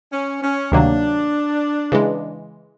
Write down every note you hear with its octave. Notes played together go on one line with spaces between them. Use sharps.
C#4
C#4
D2 C3 D#3 F#3 A#3 D4
C#3 E3 G#3